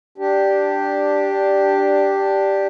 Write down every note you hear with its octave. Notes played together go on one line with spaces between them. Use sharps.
D4 G4